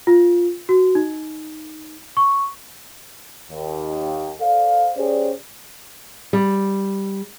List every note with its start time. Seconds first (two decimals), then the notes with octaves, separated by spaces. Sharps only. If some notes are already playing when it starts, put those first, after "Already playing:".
0.07 F4
0.69 F#4
0.95 D#4
2.17 C#6
3.50 D#2
4.41 A4 C5 D5 F5
4.97 C#4 G4 G#4 C5 D5
6.33 G3